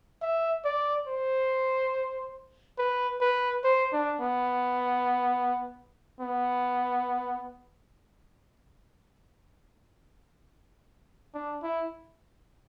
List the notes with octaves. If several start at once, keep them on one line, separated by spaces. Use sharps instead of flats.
E5
D5
C5
B4
B4
C5
D4
B3
B3
D4
E4